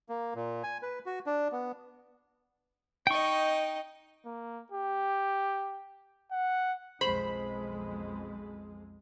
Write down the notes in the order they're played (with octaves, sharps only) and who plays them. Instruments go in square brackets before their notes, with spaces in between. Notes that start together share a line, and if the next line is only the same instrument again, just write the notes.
[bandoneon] A#3
A#2
G#5
B4
F#4
D4
B3
[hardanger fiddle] D#4 D#5 [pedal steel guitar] G5 C#6
[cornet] A#3
G4
F#5
[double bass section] B1 F2 G#3 [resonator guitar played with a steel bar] C5 [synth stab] B5